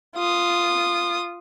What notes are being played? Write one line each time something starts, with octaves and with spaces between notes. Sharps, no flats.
F4 D#6